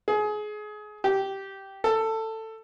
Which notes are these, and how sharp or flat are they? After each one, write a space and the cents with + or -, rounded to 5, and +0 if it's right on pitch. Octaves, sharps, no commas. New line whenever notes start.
G#4 +25
G4 -10
A4 +15